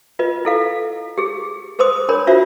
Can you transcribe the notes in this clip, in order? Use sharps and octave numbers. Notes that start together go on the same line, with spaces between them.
F4 B4 D#5
E4 A4 F5
G4 G#4
G#4 B4 C5 C6 D#6
D4 A#4 C#5 B5
D4 F4 F#4 C5 E5